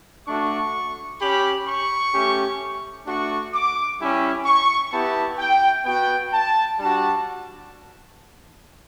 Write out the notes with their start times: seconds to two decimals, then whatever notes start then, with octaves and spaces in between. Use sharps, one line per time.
0.27 A3 D4 F#4 C#6
1.19 C#4 G4 B5
1.67 C#6
2.13 A3 C#4 G4
3.06 A3 D4 F#4 C#6
3.53 D6
3.99 G3 C#4 E4 G4
4.45 C#6
4.92 B3 E4 G4 A5
5.38 G5
5.86 B3 F#4 G5
6.32 A5
6.79 G3 D4 F#4 A5